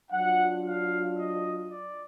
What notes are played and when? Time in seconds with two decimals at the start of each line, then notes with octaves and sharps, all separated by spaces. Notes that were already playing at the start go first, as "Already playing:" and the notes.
0.11 F#3 D4 F4 F#5
0.65 F5
1.17 D#5
1.70 D5